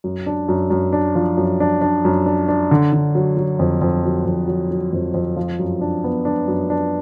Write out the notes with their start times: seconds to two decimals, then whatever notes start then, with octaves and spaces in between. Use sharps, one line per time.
0.04 F#2
0.26 D4
0.49 F#2
0.70 F#2
0.93 D4
1.15 F3
1.37 F#2
1.60 D4
1.81 D4
2.05 F#2
2.26 D4
2.48 D4
2.71 D3
2.92 D3
3.15 F#3
3.37 F#3
3.59 F2
3.82 F2
4.04 F#3
4.26 F2
4.48 F#3
4.71 F#3
4.93 F2
5.14 F2
5.36 F3
5.59 F#2
5.81 D4
6.04 B3
6.25 D4
6.48 F#2
6.70 D4